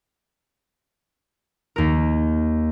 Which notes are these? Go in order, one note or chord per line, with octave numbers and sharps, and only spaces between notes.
D#2 A#4